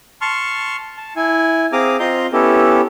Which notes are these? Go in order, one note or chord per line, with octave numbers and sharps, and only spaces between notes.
A5 C6 C#6 F6
A5
E4 G#5
C4 G#4 F5 A#5 D6 D#6
C4 F4 D#5 A#5 C6 G6
B3 C#4 E4 G4 A4